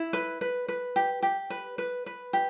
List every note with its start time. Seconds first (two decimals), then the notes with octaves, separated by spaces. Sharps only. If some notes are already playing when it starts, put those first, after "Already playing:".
Already playing: E4
0.13 B4
0.41 B4
0.68 B4
0.96 G4
1.23 G4
1.50 B4
1.78 B4
2.06 B4
2.33 G4